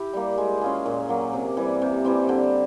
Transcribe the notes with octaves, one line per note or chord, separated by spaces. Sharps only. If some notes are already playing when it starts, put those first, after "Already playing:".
Already playing: E4 G4
G3 A#3
G#3
C#4 F4 G#4
A#2
F#3 A#3
C3
E3 G3
C3
E3 G3 C4
D3